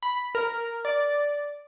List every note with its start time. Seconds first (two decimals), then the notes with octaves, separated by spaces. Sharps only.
0.03 B5
0.35 A#4
0.85 D5